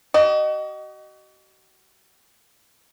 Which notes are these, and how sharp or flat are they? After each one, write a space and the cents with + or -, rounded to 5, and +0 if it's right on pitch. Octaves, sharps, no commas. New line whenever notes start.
F#4 +40 D#5 -20